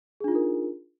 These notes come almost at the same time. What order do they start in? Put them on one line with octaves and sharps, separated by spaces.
G#4 D4 F4 D#4 A#4